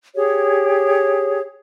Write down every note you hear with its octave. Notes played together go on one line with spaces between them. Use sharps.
G4 G#4 C#5